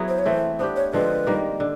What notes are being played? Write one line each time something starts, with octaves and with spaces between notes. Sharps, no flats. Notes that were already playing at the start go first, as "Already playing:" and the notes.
Already playing: F#3 B3 E4 G#4
C5
C#5
E3 A3 C4 C5
B3 D4 G4 C5
C#5
D3 F3 G#3 C4 B4
D#3 G3 A#3
D3